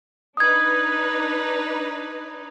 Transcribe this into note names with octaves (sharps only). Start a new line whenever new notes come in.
D4 D#4 B4 D#6 G#6